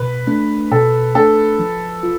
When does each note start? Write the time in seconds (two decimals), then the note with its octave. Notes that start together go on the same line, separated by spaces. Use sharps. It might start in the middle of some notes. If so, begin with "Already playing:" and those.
Already playing: B2 B4
0.27 A3 D4
0.71 B2 A4
1.15 A3 D4 A4
1.59 F3
2.03 F4